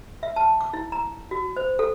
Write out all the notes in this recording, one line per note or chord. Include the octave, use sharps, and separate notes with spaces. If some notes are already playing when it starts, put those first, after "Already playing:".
E5
A5
D6
E4
A#5
F#4
C5
A4